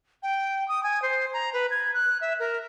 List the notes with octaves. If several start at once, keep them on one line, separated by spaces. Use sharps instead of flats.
G5
D#6
G#5
C5
A#5
B4
G#6
F#6
E5
A#4